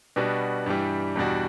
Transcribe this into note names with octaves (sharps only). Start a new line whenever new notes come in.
B2 G3 B3 D4 F#4
G2 E3 G3
E2 B2 G3 D4 F#4